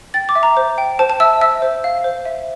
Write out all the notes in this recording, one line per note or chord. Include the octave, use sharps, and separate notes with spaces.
G5 A6
D6
E5
A#5
C5
G5
C5 A5
A5
E5 E6
E5 E6
C5
F5
C5
E5